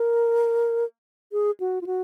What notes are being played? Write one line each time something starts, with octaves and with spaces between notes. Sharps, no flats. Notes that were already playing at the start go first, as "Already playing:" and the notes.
Already playing: A#4
G#4
F#4
F4
F#4